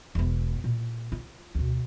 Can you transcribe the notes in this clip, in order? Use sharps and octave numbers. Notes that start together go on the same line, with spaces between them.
E1 B3
A#2
F4
D2 B2